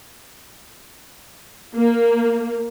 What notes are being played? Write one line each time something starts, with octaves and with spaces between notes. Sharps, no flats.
A#3